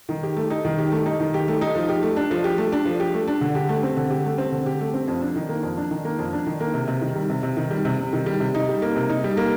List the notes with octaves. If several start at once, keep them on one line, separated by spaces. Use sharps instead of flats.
D#3
G4
A3
D#4
D#3
G4
A3
D#4
D#3
G4
A3
D#4
F3
G4
A3
D4
F3
G4
A3
D4
F3
G4
A3
D4
D3
G4
A3
C4
D3
G4
A3
C4
D3
G4
A3
C4
F2
D4
D#3
A#3
F2
D4
D#3
A#3
F2
D4
D#3
A#3
C3
C3
D#3
G3
C3
C3
D#3
G3
C3
C3
D#3
G3
C3
D#4
G3
A#3
C3
D#4
G3
A#3